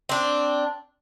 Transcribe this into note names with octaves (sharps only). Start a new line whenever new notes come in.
C4 D4